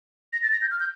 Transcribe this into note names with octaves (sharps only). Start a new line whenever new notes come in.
A#6
A6
A#6
G6
F6
G6